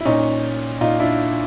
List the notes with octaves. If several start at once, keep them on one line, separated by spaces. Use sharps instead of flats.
E4
A#2 C#4 D#4
A#2 D#4 F4
D4 E4